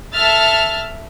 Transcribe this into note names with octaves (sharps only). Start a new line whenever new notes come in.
A4 E5 F6 A6